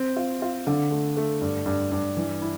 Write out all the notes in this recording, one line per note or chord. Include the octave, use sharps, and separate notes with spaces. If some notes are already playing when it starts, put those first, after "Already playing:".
Already playing: C4
F4
F4
D3
A3
A3
G2
G2
G2
E3
E4